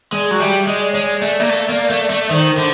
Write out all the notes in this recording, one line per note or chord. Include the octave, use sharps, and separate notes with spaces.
G#3 D5
F#3
G3 E5
G#3 D#5
D5
G#3 C#5
D5
A3
A#3
A3
A#3
A3
A3
D#3 C5
D3